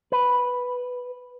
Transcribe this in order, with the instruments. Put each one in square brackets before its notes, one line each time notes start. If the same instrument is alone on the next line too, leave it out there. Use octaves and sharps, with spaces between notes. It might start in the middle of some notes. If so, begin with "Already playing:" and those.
[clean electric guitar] B4